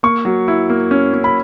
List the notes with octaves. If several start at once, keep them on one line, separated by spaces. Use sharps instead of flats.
A#3 C#6
F#3
E4
A#3
C#4
C#4
B5